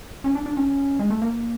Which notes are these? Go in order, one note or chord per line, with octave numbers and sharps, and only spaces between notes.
C#4
D4
D4
C#4
G#3
A3
A#3